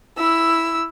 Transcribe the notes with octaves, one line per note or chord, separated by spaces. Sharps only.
E4 E6